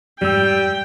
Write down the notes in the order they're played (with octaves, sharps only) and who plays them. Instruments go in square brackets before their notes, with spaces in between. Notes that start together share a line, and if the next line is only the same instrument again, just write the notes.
[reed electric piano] F2 G#2 E6 [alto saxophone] G3 [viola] G5